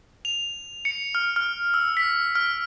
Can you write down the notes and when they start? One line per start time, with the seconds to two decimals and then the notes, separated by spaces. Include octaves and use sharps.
0.25 F7
0.85 C#7
1.15 F6
1.36 F6
1.74 E6
1.97 B6
2.35 F6